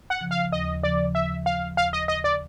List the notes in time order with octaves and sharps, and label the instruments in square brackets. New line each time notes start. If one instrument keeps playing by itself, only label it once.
[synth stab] F#5
[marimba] C#3 F3
[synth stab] F5
[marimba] D#2 [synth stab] D#5
[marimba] C#3 F3 [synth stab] D5
[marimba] D#2 [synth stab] E5
[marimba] C#3 F3 [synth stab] F5
[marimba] D#2 [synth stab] F5
[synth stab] D#5
[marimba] C#3 F3 [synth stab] D#5
[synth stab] D5